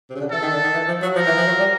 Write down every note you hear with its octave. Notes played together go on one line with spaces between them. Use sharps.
C3
C#3
D3
E3 A4
D#3
D3
D#3
E3
F3
F#3
F3 A#4
E3
F3
F#3
G3